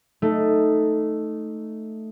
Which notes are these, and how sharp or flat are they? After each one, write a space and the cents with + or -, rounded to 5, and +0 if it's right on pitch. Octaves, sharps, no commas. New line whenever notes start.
A3 +0 D#4 +0